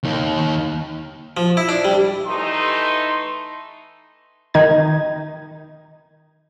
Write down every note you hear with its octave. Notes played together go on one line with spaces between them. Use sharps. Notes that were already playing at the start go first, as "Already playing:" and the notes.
D#2 D#3
F3
E4
D4
G3
E3 A3 D#4 C6
D#3 D#4 G#6